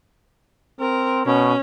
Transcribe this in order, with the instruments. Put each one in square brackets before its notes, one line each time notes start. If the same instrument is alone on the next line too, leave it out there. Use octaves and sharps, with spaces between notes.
[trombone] C4 [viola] A#4
[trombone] B2 [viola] C#4